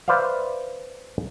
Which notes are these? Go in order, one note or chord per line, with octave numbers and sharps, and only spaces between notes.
B4 C5 D5 E5 F5